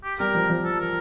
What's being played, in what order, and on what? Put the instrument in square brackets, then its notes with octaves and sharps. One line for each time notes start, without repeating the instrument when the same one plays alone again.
[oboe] G4
[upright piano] G3 [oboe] A#4
[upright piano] F3
F3
[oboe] A4
A#4